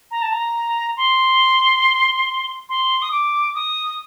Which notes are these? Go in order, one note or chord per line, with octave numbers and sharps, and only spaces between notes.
A#5
A5
A#5
C6
C6
D#6
D6
D#6